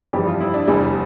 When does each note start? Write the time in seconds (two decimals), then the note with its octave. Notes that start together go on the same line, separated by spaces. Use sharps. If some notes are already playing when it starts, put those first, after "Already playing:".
0.13 G1 F2 E3 G3 G4
0.27 F4
0.40 E4
0.54 D4
0.67 F1 E2 E3 G3